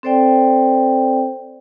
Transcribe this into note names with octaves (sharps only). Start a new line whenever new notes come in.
C4 A4 C5 D5 G5